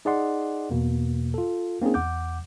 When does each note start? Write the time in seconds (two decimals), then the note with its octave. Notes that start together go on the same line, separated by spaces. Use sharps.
0.05 D#4 G#4 D5 D#5 F#5 C6
0.71 E2 B2 A#3
1.34 F4 A4
1.81 A#3 C4 C#4 D#4 G#4
1.94 E2 F#5 D6 G6